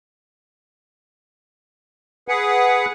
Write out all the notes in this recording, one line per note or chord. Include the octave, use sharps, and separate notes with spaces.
G#4 B4 F#5